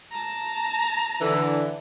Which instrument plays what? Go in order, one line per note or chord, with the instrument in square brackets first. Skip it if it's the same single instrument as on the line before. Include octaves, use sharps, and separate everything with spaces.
[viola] A5 A#5
[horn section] D3 E3